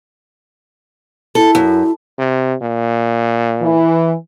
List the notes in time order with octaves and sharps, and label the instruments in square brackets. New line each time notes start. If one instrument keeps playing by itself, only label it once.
[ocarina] E4 [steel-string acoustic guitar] A4
[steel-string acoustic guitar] F#2
[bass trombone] C3
A#2
[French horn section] E3